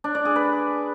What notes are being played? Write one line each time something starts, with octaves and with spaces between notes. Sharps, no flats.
D4
D5
G#4
B4